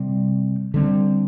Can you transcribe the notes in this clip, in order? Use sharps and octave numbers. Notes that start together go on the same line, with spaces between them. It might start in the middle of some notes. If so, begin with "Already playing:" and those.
Already playing: C3 G3 C4
D3 G3 C4